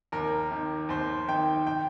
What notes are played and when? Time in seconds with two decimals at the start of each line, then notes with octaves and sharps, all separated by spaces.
0.12 D#2 A#4
0.51 D#3
0.89 D#2 C5
1.28 D#3 G5
1.67 G5